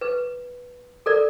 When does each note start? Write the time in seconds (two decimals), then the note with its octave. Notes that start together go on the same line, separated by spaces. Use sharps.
0.01 B4
1.06 A4 A#4 D5